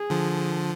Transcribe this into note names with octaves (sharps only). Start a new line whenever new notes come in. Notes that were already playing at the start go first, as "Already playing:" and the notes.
Already playing: G#4
D3 F3